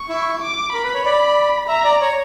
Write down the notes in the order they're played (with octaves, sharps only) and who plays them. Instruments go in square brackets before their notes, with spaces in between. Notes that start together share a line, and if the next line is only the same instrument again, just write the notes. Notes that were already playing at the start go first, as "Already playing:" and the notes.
Already playing: [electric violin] C#6
[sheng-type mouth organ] E4
[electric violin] D6
[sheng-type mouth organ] A#4 [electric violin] B5
[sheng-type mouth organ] B4
C#5
D5
[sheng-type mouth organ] E5 [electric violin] A#5
[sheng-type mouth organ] D5
C#5